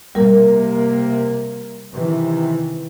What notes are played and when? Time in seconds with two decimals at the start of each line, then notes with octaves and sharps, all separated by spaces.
0.15 C3 G3 A#3 A#4
1.93 C3 D#3 E3